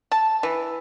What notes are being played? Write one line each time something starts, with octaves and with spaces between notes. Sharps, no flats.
A5
E3